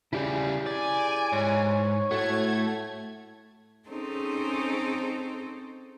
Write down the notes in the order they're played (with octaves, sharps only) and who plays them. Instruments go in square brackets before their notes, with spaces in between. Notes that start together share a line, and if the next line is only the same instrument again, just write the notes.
[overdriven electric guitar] C#3 G3 [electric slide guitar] E4 G4 G#4
[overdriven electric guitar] D5 [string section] G#5
[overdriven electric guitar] G#2 [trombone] C#5
[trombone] A2 [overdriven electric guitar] A3 [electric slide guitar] F#4 [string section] G#6
[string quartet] C4 C#4 D#4 G#4 A4 C5